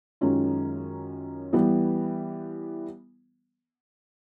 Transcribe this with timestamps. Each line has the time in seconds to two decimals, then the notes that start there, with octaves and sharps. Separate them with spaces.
0.21 F#2 D#3 G#3 C#4 F4
1.53 E3 G3 B3